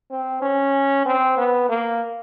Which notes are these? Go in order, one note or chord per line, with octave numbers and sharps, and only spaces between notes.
C4
C#4
C4
B3
A#3